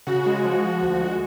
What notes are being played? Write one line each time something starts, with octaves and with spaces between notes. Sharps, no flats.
C#3 F#4
G#3
F3
F3
D2
G#3